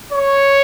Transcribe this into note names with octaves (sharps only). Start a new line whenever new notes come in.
C#5